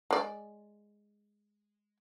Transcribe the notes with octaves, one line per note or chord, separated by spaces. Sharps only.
G#3 D5